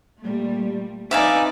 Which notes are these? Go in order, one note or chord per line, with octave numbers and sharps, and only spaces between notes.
A#2 G3 A3
C4 D#4 B4 D5 E5 F5 G#5